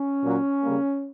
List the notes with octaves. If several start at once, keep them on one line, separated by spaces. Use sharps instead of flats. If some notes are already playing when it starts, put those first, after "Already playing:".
Already playing: C#4
A#2 F#3 A#3
C#3 G3 A#3